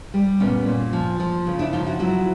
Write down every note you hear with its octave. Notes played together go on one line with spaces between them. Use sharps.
G3
A#2 B3 C#4
A#2
F3
F3
C#3
D4 E4
F3 D#4 F4
E4 F#4
F#3 E4 F#4